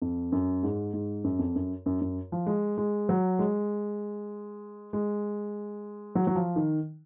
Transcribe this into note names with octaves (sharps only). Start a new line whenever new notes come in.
F2
F#2
G#2
G#2
F#2
F2
F#2
F#2
F#2
F3
G#3
G#3
F#3
G#3
G#3
F#3
F#3
F3
D#3